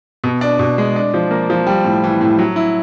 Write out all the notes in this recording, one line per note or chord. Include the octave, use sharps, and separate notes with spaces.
B2
D4
B2
G#3
D4
F3
A#3
F3
G3
A2
E3
A2
F#3
E4